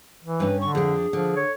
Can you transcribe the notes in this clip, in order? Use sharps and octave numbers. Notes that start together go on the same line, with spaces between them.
E3
G2 C#4 B4
D3 C#6
F2 D4 G#4
D3 F3
C#5